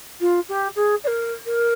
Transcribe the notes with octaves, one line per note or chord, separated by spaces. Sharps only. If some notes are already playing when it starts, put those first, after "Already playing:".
F4
G4
G#4
D5
A#4
A#4